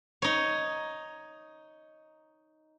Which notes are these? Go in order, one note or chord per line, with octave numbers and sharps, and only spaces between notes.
D#4 C#5